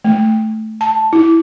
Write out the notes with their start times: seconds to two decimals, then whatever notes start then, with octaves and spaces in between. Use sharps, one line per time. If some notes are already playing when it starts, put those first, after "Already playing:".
0.04 A3
0.81 A5
1.13 E4